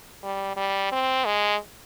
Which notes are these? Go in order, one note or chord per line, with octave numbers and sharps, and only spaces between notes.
G3
G3
C4
G#3